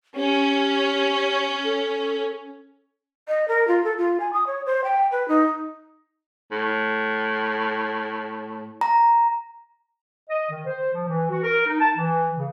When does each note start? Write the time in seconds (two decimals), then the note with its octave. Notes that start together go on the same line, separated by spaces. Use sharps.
0.17 C#4 G4
1.64 A4
3.28 D#5
3.48 A#4
3.68 F4
3.84 A4
3.98 F4
4.20 G#5
4.33 D#6
4.47 C#5
4.66 C5
4.84 G5
5.11 B4
5.28 D#4
6.52 A2
8.81 A#5
10.29 D#5
10.51 D#3
10.66 C5
10.93 F3
11.08 E3
11.30 F#4
11.43 A#4
11.66 D#4
11.80 A5
11.97 E3
12.37 C#3